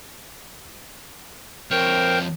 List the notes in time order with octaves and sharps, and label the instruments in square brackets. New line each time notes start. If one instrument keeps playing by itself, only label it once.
[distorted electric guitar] F2 C#5 [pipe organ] A#4 C5 G5